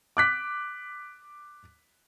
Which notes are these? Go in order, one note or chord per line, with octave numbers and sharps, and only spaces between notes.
D6 F#6 B6